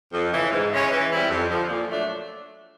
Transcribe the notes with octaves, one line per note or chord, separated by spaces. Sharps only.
F2
C#3 E3
G#2
E3 G#3 C#4 E4
E3
G3 C4 E4
F2
D3 F3
A#2
F#3 A3 D4